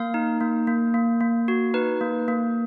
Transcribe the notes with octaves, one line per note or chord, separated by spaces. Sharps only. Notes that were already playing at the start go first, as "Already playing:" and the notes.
Already playing: A#3 F5
D#4
A#3
A#3
A#3
A#3
F#4
D#4 B4
A#3
A#3